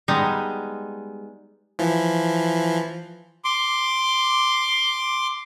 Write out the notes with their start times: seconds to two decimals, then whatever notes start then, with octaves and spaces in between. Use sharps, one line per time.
0.08 G3 G#3 B3 D#4
1.79 E3 F3
3.45 C6 D6